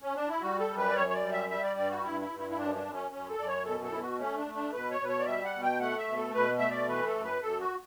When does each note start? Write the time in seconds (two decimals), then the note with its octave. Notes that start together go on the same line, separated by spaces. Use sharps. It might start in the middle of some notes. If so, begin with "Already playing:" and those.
0.02 C#4
0.16 D4
0.29 E4
0.41 G3 F#4
0.60 A4
0.69 F#2
0.78 B4
0.89 D5
0.96 F#2 C#5
1.09 C#5
1.14 D5
1.23 G3
1.32 E5
1.49 G3 E5
1.63 D5
1.76 G2 D5
1.90 F#4
2.03 G2 E4
2.21 E4
2.30 G2
2.39 E4
2.50 E4
2.57 F#2 D4
2.75 D4
2.84 F#2
2.93 C#4
3.11 F#2 C#4
3.29 A4
3.38 F#2 D5
3.47 C#5
3.65 B2 A4
3.84 A4
3.92 B2 E4
4.01 F#4
4.19 A3 C#4
4.37 D4
4.46 A3
4.55 D4
4.73 B2 B4
4.91 C#5
5.00 B2 B4
5.08 C#5
5.20 D5
5.26 G3 E5
5.45 F#5
5.53 B2
5.62 G5
5.80 A3 F#5
5.98 E5
6.07 B2
6.16 A4
6.35 B2 B4
6.59 A3 E5
6.71 D5
6.88 E3 B4
7.06 A4
7.15 F#2
7.24 B4
7.42 F#2 A4
7.60 F#4